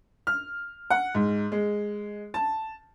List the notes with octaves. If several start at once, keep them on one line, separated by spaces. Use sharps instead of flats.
F6
F#5
G#2
G#3
A5